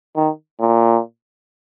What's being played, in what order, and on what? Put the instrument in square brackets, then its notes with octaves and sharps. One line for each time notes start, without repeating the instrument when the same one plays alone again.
[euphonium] D#3
A#2